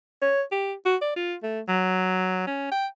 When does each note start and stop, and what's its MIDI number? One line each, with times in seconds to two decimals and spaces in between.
0.22 0.42 73
0.52 0.73 67
0.86 0.96 66
1.02 1.12 74
1.16 1.35 65
1.43 1.61 57
1.69 2.46 54
2.47 2.71 61
2.71 2.87 79